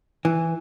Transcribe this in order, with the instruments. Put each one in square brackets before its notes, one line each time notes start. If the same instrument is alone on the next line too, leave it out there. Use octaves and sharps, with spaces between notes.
[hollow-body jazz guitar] E3